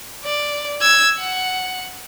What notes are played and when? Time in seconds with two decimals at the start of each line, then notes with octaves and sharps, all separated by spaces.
0.25 D5
0.81 E6 G#6
1.18 F#5